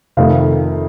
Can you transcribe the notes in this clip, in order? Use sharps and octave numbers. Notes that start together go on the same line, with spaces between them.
F1 F2 C3 D#3 A3 F5